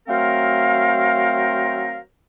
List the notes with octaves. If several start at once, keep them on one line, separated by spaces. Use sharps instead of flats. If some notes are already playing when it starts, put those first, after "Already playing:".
F#3 A3 C4 A#4 C5 F5